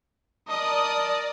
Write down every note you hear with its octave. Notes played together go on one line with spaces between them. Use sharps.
A#4 D5 D#5 A5 D#6